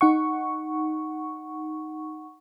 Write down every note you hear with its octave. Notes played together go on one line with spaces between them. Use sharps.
D#4 F#5 C#6